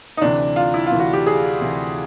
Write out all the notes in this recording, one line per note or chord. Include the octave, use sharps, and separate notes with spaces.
D#4
D2 C3 E3 D4
F4
E4
F4
D2 C3 E3
F#4
G4
G#4
D2 C3 E3 E4